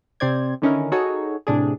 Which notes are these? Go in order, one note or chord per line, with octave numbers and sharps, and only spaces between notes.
C3 C4 C5 D5 G#6
D3 D#3 C#4 D#4 E4 A#4
D#4 F#4 G#4 A4 C#5
A2 C3 D4 G#4